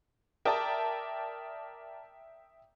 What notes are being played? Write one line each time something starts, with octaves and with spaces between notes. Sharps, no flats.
A#4 D5 E5 G5 A5 D#6